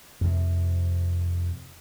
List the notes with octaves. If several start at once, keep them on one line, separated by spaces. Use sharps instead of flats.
F2 C3